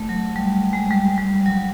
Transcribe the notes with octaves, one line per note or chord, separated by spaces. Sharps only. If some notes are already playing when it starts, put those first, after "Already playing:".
Already playing: A3
F#3
G3
G#3
G3
G3
F#3